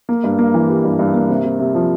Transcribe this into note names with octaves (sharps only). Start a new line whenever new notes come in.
A#3
G2
A#3
E3
G3
G2
G2
A#3
C3
C3
C3
F3